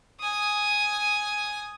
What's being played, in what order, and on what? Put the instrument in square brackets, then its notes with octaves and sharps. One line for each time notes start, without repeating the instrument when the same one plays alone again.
[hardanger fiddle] G#5 D#6